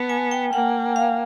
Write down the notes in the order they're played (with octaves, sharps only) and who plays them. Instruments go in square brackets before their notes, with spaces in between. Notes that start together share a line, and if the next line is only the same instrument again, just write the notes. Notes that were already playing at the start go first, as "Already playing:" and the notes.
Already playing: [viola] B3 [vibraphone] A5
[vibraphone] G#5
G5
[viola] A#3 [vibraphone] F#5
[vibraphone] F5